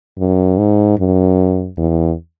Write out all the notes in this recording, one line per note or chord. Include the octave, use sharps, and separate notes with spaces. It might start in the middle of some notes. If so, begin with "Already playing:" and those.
F#2
G#2
F#2
E2